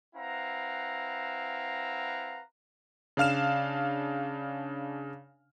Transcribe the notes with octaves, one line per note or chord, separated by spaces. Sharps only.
C4 E4 B4 F5 F#5 A#5
C#3 D4 F5 F6 E7